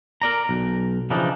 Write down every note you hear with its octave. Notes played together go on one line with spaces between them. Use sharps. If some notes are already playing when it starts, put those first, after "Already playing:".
A#4 D5 A#5
B1
C#3 E3 F3 D4 D#4